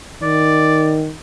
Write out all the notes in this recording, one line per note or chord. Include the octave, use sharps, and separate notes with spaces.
D#3 D5